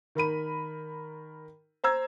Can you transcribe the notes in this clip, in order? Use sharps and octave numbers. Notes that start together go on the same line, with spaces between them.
D#3 A#4 B5 D#7
C5 A#5 E6 G#6